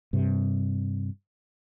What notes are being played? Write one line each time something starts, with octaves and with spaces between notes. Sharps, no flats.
G2 C3